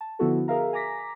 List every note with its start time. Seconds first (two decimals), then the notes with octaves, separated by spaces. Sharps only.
0.01 A5
0.19 D3 F3 B3 E4 F#4 A4
0.48 G#4 A#4 E5 F5 A#5
0.73 G#5 A#5 D6 A#6 B6